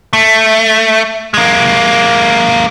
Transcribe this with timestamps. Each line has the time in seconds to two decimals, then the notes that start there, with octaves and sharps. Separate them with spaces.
0.13 A3
1.34 G#3 A#3